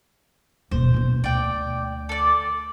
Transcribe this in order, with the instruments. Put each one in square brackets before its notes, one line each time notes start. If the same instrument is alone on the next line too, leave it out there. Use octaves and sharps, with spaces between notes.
[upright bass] D#1 B2 [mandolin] C5
[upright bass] A#1 B2
[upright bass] D2 [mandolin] D5 G5
[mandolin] A4 D5